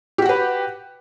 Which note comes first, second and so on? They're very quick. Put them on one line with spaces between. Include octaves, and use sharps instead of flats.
G4 F#4 F#5 B4